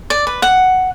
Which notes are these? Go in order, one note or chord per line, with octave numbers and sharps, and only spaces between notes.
D5
B4
F#5